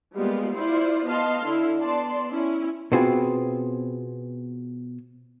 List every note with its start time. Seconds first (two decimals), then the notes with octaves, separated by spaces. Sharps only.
0.15 G3 G#3 A#3 B3 F4
0.55 E4 F4 C5 D5
1.07 B3 D#5 F5 A5 C6
1.44 D3 E4
1.78 B3 D5 A5 C6
2.31 C#4 E4
2.92 B2 B3 C4 F4 G#4